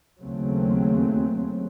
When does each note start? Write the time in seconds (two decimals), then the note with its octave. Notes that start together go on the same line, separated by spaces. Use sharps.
0.20 D#2 C#3 F#3 A3 C4